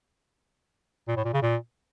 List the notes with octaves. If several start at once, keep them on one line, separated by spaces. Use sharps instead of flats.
A#2
A2
A#2
C#3
A#2